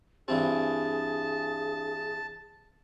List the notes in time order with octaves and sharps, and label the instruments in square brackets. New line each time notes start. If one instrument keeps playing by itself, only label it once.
[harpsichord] G2 E3 C4 [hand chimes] D4 G4 [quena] G#4 [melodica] A5